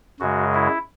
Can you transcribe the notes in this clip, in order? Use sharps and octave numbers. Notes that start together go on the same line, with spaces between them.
F#2 C#3 G#3 F#4
E4